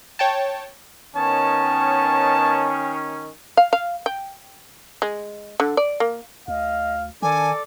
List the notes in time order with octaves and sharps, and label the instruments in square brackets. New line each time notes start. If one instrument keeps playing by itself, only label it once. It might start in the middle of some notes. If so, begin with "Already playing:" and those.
[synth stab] C#5 G5 A5
[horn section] D#3 C#4 [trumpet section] B3 C#5 A5
[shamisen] F5
F5
G5
G#3
D3
D5
A#3
[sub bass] D2 [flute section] D#5 [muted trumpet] F5
[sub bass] D#3 [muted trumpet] D4 [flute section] A4 D5 D6 [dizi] G#5